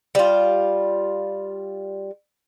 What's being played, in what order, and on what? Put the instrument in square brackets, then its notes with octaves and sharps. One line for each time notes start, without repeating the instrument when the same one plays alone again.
[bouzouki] G3 F4